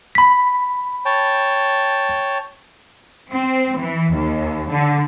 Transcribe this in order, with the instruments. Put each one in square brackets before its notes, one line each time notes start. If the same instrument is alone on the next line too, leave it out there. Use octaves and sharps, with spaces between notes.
[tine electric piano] B5 B6
[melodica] C#5 G5 A5
[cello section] C4
E3
D#2
D3